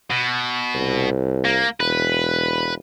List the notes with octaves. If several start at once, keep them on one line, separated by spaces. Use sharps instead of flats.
B2
C2
A#3
E1 B4